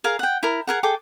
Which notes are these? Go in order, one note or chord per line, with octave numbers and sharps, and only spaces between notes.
G#4 A#4 F5
F#5 G5
E4 A#4
G#4 A#4 F#5
G#4 A4 G5 D6